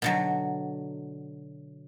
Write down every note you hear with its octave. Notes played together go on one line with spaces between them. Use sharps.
B2 D3 F#3